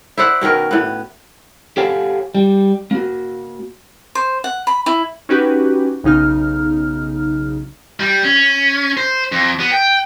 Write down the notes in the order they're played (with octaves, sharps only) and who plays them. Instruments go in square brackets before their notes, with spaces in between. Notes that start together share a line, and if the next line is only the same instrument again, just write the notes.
[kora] E4 C5 D5 F#5
B2 D#3 C#4 A#4
A2 B3
[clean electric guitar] G4 A4 C#5 F5 F#5 G#5
G3
A#3 F#4
[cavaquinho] C5
F#5
B5
E4
[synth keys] C#4 D#4 F#4 G4 B4
B1 C#3 D#4 F6
[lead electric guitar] G3
C#4
C5
F2
B3
G5